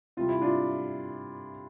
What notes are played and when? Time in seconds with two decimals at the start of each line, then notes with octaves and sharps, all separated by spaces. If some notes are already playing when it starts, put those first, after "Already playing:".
0.17 C3 G3 F4
0.29 E4
0.41 D4 F4